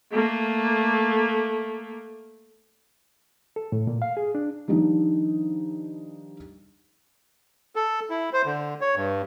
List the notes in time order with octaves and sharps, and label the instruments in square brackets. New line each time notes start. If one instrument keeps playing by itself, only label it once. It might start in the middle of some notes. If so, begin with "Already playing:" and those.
[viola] A3 A#3
[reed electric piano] A4
A2
A#2
F5
G#4
D4
[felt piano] D#3 F3 G3 D4 D#4 F4
[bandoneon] A4
E4
C5
D3
C#5
G2